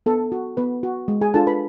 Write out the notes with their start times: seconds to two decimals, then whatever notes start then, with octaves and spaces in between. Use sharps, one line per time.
0.06 B3 A4
0.32 F#4
0.57 B3 B4
0.83 F#4
1.08 G#3
1.21 G#4 G#5
1.34 D4 F4 A4 A5
1.47 B4 B5